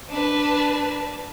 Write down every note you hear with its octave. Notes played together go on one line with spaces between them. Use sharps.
D4 B4